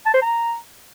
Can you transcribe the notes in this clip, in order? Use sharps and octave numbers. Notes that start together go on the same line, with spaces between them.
A5
C5
A#5